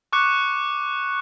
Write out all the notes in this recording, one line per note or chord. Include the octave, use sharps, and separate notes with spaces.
C#6 D6 F#6 C#7